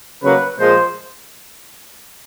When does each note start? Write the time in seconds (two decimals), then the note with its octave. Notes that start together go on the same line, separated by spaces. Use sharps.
0.23 C#3 F#3 A#3 B4
0.59 A#2 F3 G#3 C5